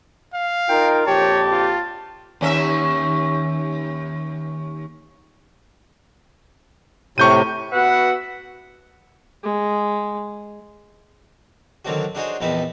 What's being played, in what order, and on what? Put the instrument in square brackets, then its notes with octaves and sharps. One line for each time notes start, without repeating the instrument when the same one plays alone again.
[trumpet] F5
[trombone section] D#4 F4 A#4 [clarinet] G5
[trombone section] A#1 F2 G4 [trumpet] C#5 [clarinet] A5
[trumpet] F4
[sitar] D#2 C#4 E5
[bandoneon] A2 C3 [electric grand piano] C#6 G6 D#7
[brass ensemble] B3 F#4 B4 E5 F#5
[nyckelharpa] G#3
[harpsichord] D3 D#3 F#3 C4 D4 F#4
D4 D#4 F#4 G#4 C5 C#5
A#1 E2 C4 D#4 B4 A5